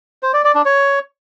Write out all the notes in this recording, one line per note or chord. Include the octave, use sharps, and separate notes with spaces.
C5
D5
D5
D4
C#5